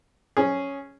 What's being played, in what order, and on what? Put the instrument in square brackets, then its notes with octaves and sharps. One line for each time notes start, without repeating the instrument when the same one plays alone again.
[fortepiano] C#4 G#4